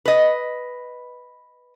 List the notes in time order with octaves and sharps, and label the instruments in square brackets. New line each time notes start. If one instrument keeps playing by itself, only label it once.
[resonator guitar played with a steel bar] B4 D#5